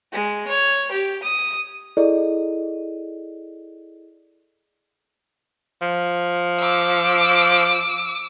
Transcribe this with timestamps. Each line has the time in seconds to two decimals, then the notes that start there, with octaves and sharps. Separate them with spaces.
0.12 G#3
0.47 C#5
0.92 G4
1.23 D#6
1.97 E4 G#4 A4 D5 D#5
5.82 F3
6.60 D6 E6